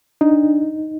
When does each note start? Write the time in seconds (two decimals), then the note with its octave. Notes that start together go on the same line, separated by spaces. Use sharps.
0.21 D4 D#4